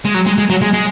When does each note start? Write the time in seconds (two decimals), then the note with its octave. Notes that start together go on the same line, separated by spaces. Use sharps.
0.05 G#3
0.15 F#3
0.26 G#3
0.38 G#3
0.50 F#3
0.62 G#3
0.74 G#3